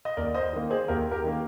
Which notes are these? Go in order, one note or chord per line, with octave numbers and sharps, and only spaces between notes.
D#5
D#2 A#4 D5
C5 D#5
D#3 A#3
G#4 C5
D#2 G4 A#4
G4 A#4
D#3 A#3